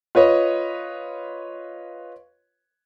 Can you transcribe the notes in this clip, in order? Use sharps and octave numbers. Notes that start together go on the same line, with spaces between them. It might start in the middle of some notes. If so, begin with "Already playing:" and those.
F4 B4 C#5 D#5